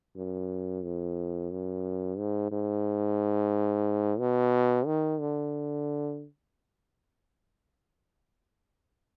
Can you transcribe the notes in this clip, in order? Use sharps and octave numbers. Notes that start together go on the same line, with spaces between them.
F#2
F2
F#2
G#2
G#2
B2
D#3
D3